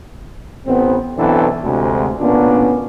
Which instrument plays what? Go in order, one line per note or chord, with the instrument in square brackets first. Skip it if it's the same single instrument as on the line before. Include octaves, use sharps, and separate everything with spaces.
[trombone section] A1 B3 C4
B1 E3 B3 C4 D4 A4
D2 C3 G#3
A1 A#2 B3 C#4 D4